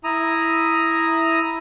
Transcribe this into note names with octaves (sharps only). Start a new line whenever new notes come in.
E4 A#5 D#6